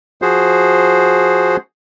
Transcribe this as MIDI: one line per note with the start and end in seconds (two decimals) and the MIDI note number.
0.22 1.57 53
0.22 1.57 66
0.22 1.57 68
0.22 1.57 72